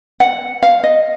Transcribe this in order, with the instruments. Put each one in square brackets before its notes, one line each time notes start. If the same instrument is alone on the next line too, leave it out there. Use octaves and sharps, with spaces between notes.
[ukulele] F#5
F5
D#5